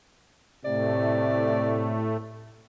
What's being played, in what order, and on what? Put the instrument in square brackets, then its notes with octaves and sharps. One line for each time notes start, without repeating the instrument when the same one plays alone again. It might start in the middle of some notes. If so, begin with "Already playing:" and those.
[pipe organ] A2 A3 [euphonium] C3 [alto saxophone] D5